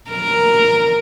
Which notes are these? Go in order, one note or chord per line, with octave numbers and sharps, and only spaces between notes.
A#4